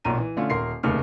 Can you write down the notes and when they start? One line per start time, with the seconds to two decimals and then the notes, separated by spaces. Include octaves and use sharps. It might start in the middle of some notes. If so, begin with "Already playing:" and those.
0.05 B1 A#2 A#5 D#7
0.18 E3
0.37 D3 A3 C#4 F4
0.50 D#1 A#4 C6 C7
0.83 F1 D#2 C#3 A3 F6